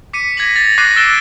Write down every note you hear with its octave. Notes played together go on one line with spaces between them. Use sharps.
D6 B6 C#7 D#7
G#6 A#6 B6 F#7
A6 A#6 F7
C#6 D6 F#6 A#6 C7 D#7
E6 A6 D7 E7 G7